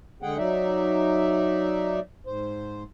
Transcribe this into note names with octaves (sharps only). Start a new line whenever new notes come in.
D3 G#3 G#4 F#5 G5
F#3 D#4 D5 E5
G#2 C5